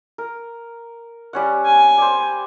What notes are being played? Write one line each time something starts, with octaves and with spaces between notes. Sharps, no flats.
A#4
G3 C#4 F#5
G#5
C5 D5